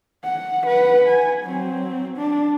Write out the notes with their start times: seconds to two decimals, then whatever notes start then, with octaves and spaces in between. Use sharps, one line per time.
0.24 F#5
0.66 B4 F#5
1.08 G#5
1.44 F#3 C4
2.17 D4